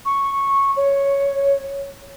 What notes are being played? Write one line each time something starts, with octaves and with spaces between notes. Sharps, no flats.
C#6
C#5